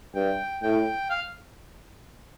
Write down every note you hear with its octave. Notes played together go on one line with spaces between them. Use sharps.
G2 G5
A2 G5
F5